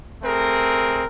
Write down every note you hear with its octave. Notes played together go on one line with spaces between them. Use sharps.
A3 C4 G#4 A#4